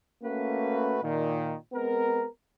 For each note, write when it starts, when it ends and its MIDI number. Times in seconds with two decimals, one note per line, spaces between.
0.23 0.97 57
0.23 0.97 58
0.23 0.97 61
0.23 0.97 66
0.23 0.97 71
1.02 1.54 46
1.02 1.54 51
1.73 2.25 56
1.73 2.25 59
1.73 2.25 60
1.73 2.25 70